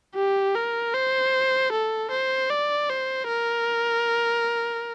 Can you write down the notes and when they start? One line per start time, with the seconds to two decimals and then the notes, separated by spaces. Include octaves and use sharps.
0.15 G4
0.56 A#4
0.94 C5
1.72 A4
2.11 C5
2.50 D5
2.89 C5
3.28 A#4